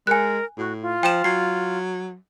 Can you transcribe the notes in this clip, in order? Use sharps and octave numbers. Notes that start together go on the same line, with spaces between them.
G#3 A#4 G#5 F#6
A2 F#4
F4
F3 G5 E7
F#3 C7